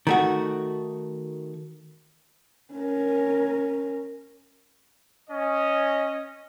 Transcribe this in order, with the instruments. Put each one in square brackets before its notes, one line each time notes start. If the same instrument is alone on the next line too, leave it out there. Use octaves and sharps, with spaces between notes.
[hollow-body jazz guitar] D#3 A3 F#4
[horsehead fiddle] C#4 A#4
[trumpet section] C#4 D#5